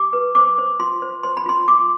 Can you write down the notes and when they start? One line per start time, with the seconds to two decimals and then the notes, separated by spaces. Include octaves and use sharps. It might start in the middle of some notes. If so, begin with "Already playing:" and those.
Already playing: G4 D6
0.13 B4
0.35 C5 D6
0.58 C5
0.80 F4 C6
1.02 C5
1.23 C5 C6
1.37 B5
1.46 F4 C6
1.68 F4 D6